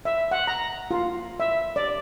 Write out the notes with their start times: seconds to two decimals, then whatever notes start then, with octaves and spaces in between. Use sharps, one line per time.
0.05 E5
0.31 F#5
0.47 A#5
0.91 F4
1.40 E5
1.76 D5